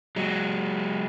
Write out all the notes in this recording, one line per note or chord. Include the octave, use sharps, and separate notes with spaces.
F#3 G#3